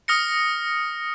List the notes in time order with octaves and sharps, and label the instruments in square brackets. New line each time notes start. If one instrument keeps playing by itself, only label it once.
[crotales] D#6 F6 A#6 C#7